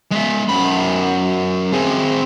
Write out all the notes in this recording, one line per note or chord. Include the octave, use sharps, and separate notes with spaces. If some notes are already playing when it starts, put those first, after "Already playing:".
G#3 E5
F#2 B5
C4 G#4